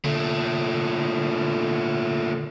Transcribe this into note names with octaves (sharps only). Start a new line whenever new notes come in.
A#2 D3 A3